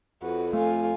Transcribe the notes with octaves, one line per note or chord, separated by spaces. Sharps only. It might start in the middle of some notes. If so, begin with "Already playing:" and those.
F2 F#4 B4
A3 F4 G#5